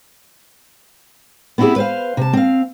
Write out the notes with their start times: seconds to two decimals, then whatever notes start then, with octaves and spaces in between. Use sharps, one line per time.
1.58 B3 C4 D#4 E4 G4 G#4
1.76 B4 C5 F5
2.17 C3 A5
2.33 C4 F5